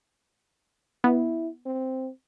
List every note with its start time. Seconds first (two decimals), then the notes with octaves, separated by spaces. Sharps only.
1.04 B3 E4
1.66 C4